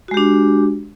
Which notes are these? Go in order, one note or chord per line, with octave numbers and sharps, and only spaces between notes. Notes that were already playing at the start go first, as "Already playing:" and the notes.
G#3 D4 F#4 G4